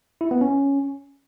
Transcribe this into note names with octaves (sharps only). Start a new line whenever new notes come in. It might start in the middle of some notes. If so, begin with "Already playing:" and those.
E4
B3
C#4